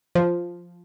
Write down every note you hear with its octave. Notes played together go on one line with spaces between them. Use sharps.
F3